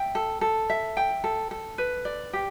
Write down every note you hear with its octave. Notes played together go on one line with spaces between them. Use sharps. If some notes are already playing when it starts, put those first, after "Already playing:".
Already playing: E5 G5
A4
A4
E5
G5
A4
A4
B4
D5
G4